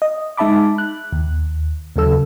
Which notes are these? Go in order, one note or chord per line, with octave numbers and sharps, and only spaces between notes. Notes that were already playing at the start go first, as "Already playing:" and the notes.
D#5
G#3 D#4 E5 A5 B5 D6
F#6
D#2
D#2 C#3 F#3 A4 E6